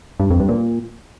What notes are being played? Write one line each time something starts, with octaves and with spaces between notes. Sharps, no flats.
G2
F2
G2
A#2